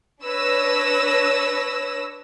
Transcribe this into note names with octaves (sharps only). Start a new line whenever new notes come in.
D4 B4 C#5 E6 A#6